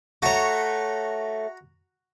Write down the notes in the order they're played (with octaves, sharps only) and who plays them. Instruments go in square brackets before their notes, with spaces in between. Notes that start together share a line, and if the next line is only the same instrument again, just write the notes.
[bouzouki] A3 C#5 [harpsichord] F#4 A#5